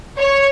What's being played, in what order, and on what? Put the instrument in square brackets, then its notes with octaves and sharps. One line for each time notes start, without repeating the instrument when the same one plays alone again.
[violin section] C#5